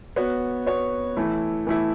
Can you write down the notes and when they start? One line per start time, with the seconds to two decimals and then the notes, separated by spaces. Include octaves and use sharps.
0.16 B3 F#4 C#5
0.67 B3 F#4 C#5
1.17 E3 A3 E4
1.67 E3 A3 E4